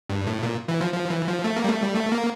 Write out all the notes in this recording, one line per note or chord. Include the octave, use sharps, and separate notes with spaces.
G2
A2
A#2
E3
F3
F3
E3
F3
A3
A#3
G3
A3
G3
A3
A#3